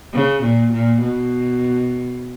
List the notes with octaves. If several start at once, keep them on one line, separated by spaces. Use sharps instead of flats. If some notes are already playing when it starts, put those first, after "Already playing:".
C#3
A#2
A#2
B2